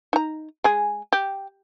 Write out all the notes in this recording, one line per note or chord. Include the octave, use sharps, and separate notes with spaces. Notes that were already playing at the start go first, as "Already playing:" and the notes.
D#4 A#5
G#3 G#4
G4